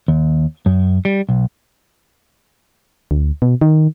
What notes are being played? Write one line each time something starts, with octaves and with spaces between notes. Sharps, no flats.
D#2
F#2
G3
B1
D2
B2
D#3